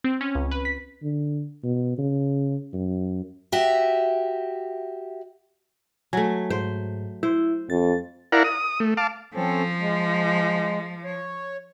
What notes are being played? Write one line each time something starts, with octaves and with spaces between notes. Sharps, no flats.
C4
C#4
C#2
B4
B6
D3
B2
C#3
F#2
F#4 G4 E5
F#3 A3 G#5
G#2 C5
E4 C5
F2 A6
E4 A#4 D5 F5 F#5 A#5
D#6
A3
F5 A5 D6
F3 C4 C#4 A4
G#3
C#5